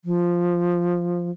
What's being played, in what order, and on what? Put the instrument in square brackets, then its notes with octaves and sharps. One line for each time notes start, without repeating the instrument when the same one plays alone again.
[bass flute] F3